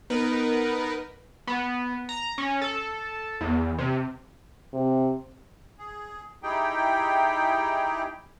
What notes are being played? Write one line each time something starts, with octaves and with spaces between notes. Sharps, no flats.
B3 D#4 A#4 B4
B3
A#5
C#4
A4
E2
C3
C3
G#4
D#4 E4 G4 G#4 G5